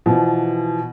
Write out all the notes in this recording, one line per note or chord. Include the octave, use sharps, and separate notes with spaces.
B2 E3 F3